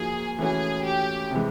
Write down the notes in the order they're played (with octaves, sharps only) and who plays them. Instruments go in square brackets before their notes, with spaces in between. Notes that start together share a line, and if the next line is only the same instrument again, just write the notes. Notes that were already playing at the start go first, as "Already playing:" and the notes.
Already playing: [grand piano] F3 A#3 D#4 F#4 [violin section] G#4
[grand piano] E3 A3 C#4 F#4 [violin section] G#4
[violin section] G4
[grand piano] C3 E3 G#3